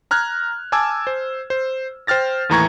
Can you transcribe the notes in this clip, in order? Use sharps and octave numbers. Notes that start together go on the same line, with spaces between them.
A#5 F6 F#6 G#6
G#5 A5 D6 E6 G#6
C5
C5
C5 G5 F6 A6 A#6
D#2 A2 E3 A#5 C#6 G#6